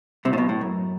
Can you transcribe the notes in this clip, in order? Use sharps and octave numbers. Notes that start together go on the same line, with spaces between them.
C2 C3
A2
B1 B2
A2
F#2